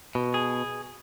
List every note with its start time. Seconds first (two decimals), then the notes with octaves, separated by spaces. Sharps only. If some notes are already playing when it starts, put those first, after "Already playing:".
0.15 B2
0.34 G#4